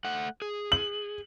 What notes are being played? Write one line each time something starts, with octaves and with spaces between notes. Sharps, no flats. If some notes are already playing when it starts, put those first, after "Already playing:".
A3 F#5
G#4
F#7